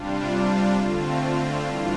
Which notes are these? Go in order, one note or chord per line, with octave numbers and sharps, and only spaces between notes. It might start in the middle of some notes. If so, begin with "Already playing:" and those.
Already playing: C3 G3 D4 F4
D3 A3 C4 F4
A2 E3 G3 D4 F4